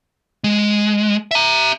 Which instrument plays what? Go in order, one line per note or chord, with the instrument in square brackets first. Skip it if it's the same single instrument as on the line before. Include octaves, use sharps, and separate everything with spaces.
[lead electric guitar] G#3
E5 A#5